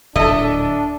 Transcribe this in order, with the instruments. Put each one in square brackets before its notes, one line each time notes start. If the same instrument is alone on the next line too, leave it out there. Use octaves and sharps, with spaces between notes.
[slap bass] D1 A#2 [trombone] D4 [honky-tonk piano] A4 E5 [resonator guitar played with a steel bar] D#5